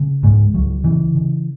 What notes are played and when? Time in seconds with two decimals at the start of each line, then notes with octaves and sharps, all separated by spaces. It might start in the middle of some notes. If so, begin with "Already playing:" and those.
Already playing: C#3
0.23 C#2 G#2 G#3
0.54 C#2 F#3
0.84 C#3 E3
1.15 C#3